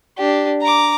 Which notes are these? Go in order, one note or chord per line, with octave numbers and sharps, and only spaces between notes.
D4 G4
A#5 D6